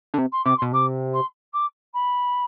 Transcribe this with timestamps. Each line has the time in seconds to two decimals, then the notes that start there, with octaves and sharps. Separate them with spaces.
0.14 D3
0.18 C3
0.32 C6
0.44 C3 D6
0.57 C6
0.62 B2
0.72 C3 D6
1.13 C6
1.53 D6
1.93 B5